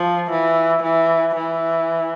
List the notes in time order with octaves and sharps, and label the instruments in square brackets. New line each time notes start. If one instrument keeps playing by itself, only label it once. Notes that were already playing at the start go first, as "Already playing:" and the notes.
Already playing: [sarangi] F3
E3
E3
E3